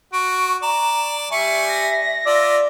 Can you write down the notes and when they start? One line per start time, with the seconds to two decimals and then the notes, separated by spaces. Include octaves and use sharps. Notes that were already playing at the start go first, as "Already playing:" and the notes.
0.13 F#4 C#6 D7
0.62 D5 A#5 E7
1.31 G3 D5 E5 G#5 C#6
1.69 A#6
2.26 F4 D5 E5